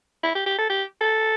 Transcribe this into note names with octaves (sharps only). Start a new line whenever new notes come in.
E4
G4
G4
A4
G4
A4